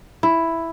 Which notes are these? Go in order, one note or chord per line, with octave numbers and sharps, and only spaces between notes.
E4